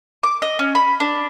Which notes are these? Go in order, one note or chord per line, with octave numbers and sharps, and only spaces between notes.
D6
D#5
C#4
B5
D4